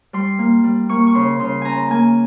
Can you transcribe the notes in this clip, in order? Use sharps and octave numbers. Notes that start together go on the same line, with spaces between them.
G3 C6
A#3
G3
A#3 C#6
C#6
C#3 C6
C#3 C6
C#4 G#5 A#5
A#3 G#5